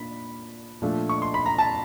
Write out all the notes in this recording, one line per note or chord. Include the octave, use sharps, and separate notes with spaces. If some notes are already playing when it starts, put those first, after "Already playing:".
Already playing: A#2 A#3 D4 B5
A#2 F3 A3 D4
C#6
C6
B5
A#5
A5